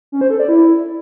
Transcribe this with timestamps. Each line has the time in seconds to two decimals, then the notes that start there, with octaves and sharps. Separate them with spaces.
0.12 C#4
0.21 C5
0.30 A4
0.39 D5
0.49 E4